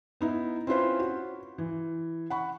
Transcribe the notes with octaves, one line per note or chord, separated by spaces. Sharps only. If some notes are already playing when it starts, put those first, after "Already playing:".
B3 D#4 E4
C4 C#4 E4 F4 B4 C5
F#4
E3
F#5 B5 C#6